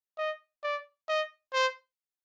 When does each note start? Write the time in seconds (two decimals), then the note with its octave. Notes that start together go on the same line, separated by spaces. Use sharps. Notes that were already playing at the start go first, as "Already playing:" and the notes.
0.18 D#5
0.63 D5
1.08 D#5
1.53 C5